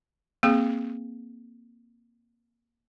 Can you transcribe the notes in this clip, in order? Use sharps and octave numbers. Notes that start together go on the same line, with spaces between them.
A#3 C4 G#4